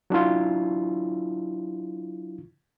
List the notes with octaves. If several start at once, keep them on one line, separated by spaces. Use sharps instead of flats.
F#3 D4 E4 F4